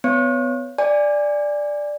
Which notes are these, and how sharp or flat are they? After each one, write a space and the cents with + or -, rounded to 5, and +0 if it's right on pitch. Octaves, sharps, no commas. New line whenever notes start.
B3 +25 C#5 +15
D5 +0 G#5 -20